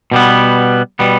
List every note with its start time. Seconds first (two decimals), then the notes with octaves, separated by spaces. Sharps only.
0.12 B2 G3 B3
0.99 B2 G3 B3